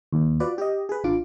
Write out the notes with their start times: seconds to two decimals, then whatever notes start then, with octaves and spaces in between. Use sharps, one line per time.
0.13 D#2
0.40 F4 F#4 B4 D5
0.58 G4 D#5
0.89 G#4 B4
1.04 A1 D4 F4 D6